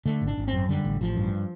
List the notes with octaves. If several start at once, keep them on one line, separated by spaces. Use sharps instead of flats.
D3 A3
G#1
D4
G#1
C4
F#2
D3 G3
A1
A1 F3
G2